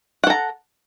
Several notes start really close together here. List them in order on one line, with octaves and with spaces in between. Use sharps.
F#5 A4 A#5